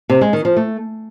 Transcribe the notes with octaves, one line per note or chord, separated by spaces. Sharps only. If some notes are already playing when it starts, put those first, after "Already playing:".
C3
G#3
D#3
F3
A3